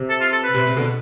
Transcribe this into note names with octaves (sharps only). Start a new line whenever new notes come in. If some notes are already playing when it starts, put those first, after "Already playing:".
Already playing: C3
A4
F4
A4
B4
C3
C3
B2 D3